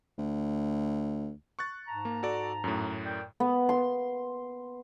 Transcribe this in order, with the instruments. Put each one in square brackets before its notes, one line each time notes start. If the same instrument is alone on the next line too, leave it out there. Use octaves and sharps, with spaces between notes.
[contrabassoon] D2
[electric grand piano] C#6 F#6 A6
[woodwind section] G#2 A5 A#5
[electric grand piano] A#3
F#4 A4 D5
F#2 A2
[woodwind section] A#4 D5 G5
[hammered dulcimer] B3
C6